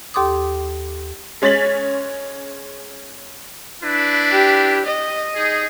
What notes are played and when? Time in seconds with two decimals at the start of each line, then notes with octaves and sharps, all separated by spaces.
0.14 D#2 G4 A4 C6 D6 D#6
1.42 G#3 C#4 C#5 A6 B6 F#7
3.83 D4 E4 B4
4.32 G4
4.86 D#5
5.35 D#4 G#4